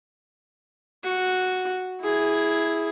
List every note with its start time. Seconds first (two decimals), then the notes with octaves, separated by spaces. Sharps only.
1.04 F#4
2.01 E4 G#4